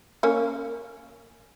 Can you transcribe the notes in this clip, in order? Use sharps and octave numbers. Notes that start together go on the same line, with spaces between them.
A#3 C#4